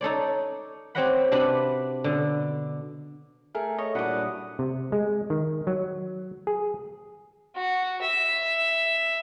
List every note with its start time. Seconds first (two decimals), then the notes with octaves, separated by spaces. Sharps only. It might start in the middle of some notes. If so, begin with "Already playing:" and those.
0.01 D#4 A4 C#5 D5
0.95 C4 G4 C#5 D#5 F#5 B5
1.32 C3 D4 F#4 B4 D5 B5
2.04 B2 D3
3.55 A3 G#4 A#4
3.78 C#5 D#5
3.95 F#2 A#2 G3 D4 E4 F#5 D6 D#6
4.59 C3
4.92 G#3
5.30 D#3
5.67 F#3
6.47 G#4
7.56 F#4
8.02 E5